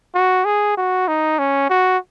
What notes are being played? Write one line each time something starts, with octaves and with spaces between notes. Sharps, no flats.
F#4
G#4
F#4
D#4
C#4
F#4